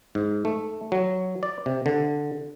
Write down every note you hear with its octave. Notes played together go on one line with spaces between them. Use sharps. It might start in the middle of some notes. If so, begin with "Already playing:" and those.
G#2
A3
F#3
D5
C3
D3